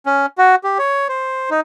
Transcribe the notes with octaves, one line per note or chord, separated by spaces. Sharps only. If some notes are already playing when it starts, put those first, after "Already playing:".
C#4
F#4
G4
C#5
C5
D#4